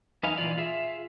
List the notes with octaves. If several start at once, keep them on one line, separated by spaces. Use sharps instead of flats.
E2 D#4 B4 D#5 F5 G#5
A#2 E3 G#3 F4 D5
F4 G#4 E5